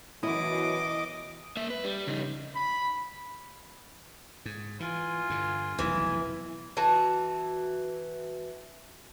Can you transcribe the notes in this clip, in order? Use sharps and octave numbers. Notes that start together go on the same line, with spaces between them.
F#2 B2 E3 E4 D#5 D6
A#3 E5
B4
G3
C#3 D#4
B5
G#2
E3 F4 G#5
G2 D3
F1 B1 F2 E3
E3 F#4 A5